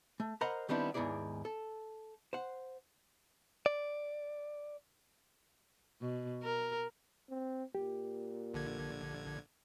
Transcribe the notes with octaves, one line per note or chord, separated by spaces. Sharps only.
A3
A#4 C5 D#5 F#5 A#5 B5
D#3 G3 B3 C4 D4 E4
D#2 G#2 B3 E4 G#4 D5
A4
C5 F#5
D5
B2
A#4
C4
A#2 G4
A#1 D3 G#6